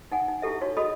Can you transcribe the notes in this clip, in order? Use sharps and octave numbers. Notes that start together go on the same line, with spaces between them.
D#4 F#5 G#5
D#4
E4 F4 G4 A4 E5
D#4 F#4 C#5
F#4 G#4 A4 D#5 B5 D#6